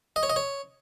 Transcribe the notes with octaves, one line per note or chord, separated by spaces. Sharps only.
D#5
C#5
D#5
C#5